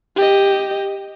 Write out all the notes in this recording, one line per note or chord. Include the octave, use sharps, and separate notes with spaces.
G4 D#5